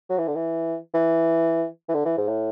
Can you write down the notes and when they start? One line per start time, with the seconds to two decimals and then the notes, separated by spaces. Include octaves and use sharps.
0.10 F#3
0.18 E3
0.27 D3
0.35 E3
0.94 E3
1.89 E3
1.94 D3
2.05 E3
2.17 G#2
2.28 A2